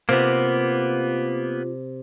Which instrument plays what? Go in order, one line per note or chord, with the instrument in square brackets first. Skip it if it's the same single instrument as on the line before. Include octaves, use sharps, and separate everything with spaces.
[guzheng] C3 [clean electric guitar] A#3 B3 [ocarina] F4